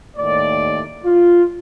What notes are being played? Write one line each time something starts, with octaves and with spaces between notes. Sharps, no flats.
D#2 A2 D5
F4